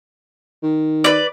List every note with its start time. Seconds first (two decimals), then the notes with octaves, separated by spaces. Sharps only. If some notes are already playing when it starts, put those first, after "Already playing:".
0.63 D#3
1.04 B4 D5